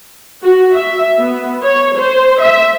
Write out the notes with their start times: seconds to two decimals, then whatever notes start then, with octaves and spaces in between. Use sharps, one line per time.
0.43 F#4
0.75 E5
1.18 B3
1.63 C#5
1.97 C5
2.41 E5